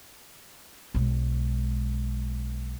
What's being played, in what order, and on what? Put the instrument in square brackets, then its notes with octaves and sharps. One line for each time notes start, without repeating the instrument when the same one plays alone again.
[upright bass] B1 G#3